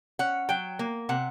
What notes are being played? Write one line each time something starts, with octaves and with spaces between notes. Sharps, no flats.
C#4 F#5
F#3 G5
A#3
C3 F#5